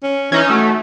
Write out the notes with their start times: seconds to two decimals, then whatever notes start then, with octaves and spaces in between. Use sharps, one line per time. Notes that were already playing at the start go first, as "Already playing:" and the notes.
0.03 C#4
0.32 E3 C#4 D#4
0.50 A3 F#4